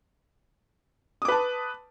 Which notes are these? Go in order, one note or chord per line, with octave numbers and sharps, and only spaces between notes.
B4 A5 D6 D#6